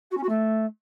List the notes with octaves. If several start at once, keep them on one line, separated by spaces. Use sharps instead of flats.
F#4
C#4
F#4
A3